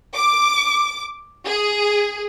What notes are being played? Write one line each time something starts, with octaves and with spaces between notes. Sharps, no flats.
D6
G#4